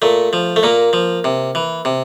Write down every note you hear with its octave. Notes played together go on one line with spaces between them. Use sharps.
A#2 A3
F3
A3
A#2 A#3
F3
C3
E3
C3